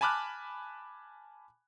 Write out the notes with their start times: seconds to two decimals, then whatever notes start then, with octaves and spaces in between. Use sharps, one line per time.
0.01 G#5 A5 B5 D6 F6 F#6